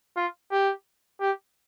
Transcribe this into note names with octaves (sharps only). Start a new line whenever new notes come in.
F4
G4
G4